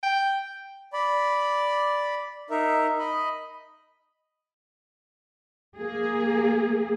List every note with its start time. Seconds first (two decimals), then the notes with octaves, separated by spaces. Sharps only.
0.03 G5
0.93 D5 B5
2.50 D#4 A#4 E5
2.99 D#5 B5
5.77 A#3 G#4